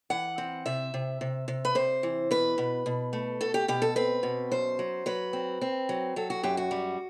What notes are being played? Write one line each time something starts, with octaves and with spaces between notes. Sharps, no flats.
E3 F#5
C4
C3 E5
C3
C3
C3
B4
C3 C5
E3
B2 B4
B2
B2
A3
B2 A4
G4
B2 G4
A4
C4 B4
B2
F#2 C5
F#3
F#3 B4
C4
C4
F#3
F#3 A4
F#4
F#2 G4
F#4
G3